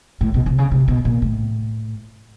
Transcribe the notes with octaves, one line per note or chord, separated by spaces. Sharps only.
A2
B2
C3
C#3
C3
B2
A#2
A2